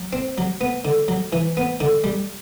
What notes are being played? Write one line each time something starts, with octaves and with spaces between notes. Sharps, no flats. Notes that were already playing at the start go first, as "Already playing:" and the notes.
Already playing: F#3
C4
F#3
B3
D3
F#3
E3
B3
D3
G3